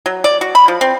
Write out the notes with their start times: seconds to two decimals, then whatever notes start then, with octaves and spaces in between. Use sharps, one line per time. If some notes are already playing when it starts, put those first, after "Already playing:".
0.06 F#3
0.24 D5
0.41 F#4
0.55 B5
0.68 F3
0.81 C4